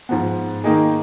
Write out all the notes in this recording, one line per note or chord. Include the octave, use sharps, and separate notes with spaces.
G#2 F3 B3
D#3 A#3 D#4 G#4